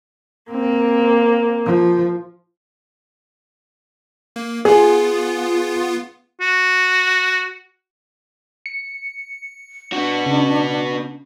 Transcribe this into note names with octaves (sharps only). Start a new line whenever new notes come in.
A#3 C4
F3
A#3
B3 F4 G#4
F#4
C#7
B3 D4 F#4
C#3